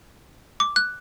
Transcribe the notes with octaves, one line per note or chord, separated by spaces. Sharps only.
D6
F#6